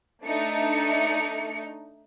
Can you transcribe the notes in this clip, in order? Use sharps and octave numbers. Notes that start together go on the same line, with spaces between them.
A3 D4 D#4 C#7